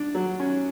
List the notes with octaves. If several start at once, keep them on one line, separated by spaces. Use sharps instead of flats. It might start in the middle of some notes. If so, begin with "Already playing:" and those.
Already playing: D4
F#3
C#4